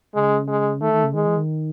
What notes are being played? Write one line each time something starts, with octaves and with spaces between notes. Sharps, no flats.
C#3 G#3
G#3
D#3 A3
D#3
C#3
D#3 G#3
E3
D#3